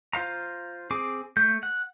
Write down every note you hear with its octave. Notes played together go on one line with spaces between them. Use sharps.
F4 C5 F5 A#5
C4 G#4 D6
A3 G6
F#5